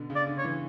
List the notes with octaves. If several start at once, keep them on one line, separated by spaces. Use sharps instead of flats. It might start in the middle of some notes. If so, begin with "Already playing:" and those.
Already playing: B2 D3
C#3
D5
D3
C#5
E3